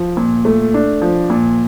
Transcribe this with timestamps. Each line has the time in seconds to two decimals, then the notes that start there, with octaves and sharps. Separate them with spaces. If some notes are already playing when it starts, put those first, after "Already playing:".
Already playing: F3
0.17 A#2
0.45 A3
0.74 D4
1.02 F3
1.30 A#2